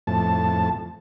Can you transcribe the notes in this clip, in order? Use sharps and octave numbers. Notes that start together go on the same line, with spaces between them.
F2 A2 A5